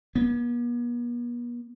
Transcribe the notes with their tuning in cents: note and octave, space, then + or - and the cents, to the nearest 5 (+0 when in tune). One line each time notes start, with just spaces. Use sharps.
B3 -45